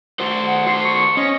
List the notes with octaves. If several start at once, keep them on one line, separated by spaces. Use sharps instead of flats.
F#4 C5
F#5
F#4 C5 C6
C#6
C#4 D#5